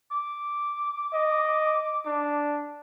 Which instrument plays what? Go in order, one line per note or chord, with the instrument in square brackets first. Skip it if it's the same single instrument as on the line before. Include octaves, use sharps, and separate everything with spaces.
[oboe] D6
[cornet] D#5
D4